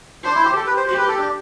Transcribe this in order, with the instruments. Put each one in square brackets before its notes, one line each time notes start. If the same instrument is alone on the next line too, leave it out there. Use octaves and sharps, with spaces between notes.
[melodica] D4 [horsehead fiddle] C5
[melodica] E4
G4
[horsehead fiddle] G4 [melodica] A4
[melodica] B4
C5
[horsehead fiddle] G4 [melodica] C5
[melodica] B4
A4
D4